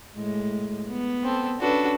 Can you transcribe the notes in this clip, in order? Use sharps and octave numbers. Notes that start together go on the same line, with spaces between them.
A2 G#3
B3
C4 A4
C#4 D4 F#4 A4 B4